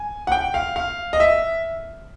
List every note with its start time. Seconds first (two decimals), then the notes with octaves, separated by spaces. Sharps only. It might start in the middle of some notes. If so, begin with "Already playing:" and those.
Already playing: G#5
0.27 F#5
0.32 G5
0.54 F5
0.76 F5
1.13 D#5
1.20 E5